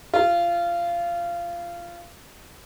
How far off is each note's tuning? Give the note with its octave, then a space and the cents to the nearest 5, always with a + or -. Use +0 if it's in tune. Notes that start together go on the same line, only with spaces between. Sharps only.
F4 -20